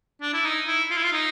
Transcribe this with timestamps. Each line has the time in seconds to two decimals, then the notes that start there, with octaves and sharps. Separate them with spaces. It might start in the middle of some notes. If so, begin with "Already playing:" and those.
0.22 D4
0.34 E4
0.45 D#4
0.67 E4
0.90 F4
0.97 E4
1.04 F4
1.13 D#4